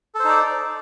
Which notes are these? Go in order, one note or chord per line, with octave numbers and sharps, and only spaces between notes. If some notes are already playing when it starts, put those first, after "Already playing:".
D#4 A4 C5 D5